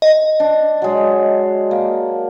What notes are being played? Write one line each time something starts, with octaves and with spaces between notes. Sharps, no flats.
D#5
D4
F#3 G#3
A#3